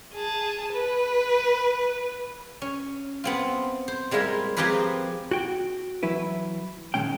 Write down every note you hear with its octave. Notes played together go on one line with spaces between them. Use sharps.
G#4 A5
B4
C#4
B3 C4 F4
C5
G3 G#3 A#3 E4 F4
F3 C4 G4 G#4 A#4 B4
F#4 G5
E3 F#3 E4 B4
A#2 D#3 G#3 C#4 G5